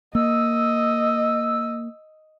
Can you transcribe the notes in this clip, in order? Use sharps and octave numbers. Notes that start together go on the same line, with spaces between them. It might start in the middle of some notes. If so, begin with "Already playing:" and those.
A#3 D#5 E6